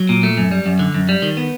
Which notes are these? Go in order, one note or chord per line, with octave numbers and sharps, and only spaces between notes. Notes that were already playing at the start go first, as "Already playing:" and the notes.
Already playing: F#3
A#2
A3
F#2
G3
F#2
D3
F#2
G3
D#3
B3